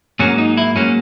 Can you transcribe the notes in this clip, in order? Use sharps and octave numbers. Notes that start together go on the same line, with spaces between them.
G#2 F#3 A#3 C#4
D#4
E4
G#2 F#3 A#3 C#4